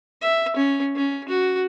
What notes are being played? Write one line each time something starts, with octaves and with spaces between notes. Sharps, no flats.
E5
C#4
C#4
F#4